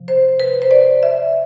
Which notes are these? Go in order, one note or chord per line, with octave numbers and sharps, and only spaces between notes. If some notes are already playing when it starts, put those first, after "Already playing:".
Already playing: C3 F3
C5
B4
C5
D5
E5